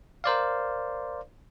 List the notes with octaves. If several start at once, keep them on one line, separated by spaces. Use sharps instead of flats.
A#4 C5 D5 F5